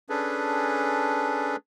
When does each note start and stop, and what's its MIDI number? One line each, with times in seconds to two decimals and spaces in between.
0.09 1.56 61
0.09 1.56 62
0.09 1.56 68
0.09 1.56 69
0.09 1.56 71